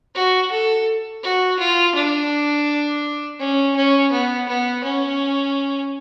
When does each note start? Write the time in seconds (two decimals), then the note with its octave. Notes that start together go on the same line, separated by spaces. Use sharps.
0.15 F#4
0.51 A4
1.23 F#4
1.59 F4
1.95 D4
3.39 C#4
3.76 C#4
4.12 B3
4.48 B3
4.84 C#4